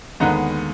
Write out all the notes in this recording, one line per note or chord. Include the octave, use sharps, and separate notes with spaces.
D#2 D3 G#3 B3 D#4 F#5 A#5